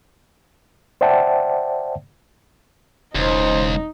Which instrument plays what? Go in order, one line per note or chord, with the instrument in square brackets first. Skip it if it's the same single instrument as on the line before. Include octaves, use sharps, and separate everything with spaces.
[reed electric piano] C5 D5 E5 F#5 G5 A5
[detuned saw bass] E1 [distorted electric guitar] C#2 [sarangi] D#4 [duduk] C5